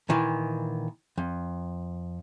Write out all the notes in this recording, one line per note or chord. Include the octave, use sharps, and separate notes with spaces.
A#2 D#3 E3
F2